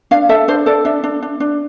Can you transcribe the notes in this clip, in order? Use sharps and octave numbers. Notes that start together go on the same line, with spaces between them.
D4 F5
A4 E5
D4 C5
A4 D5
D4 E5
D4
D4
D4